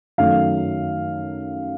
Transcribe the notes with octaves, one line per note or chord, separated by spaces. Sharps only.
F#2 D#3 F#3 A3 F5